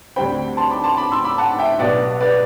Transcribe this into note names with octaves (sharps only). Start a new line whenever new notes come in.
D2 D3 G3 C4 G5 B5
A5 C6
B5 D6
A5 C6
B5 D6
C6 E6
B5 D6
F#5 A5
E5 G5
B1 B2 G3 B3 D5 F#5
B4 D5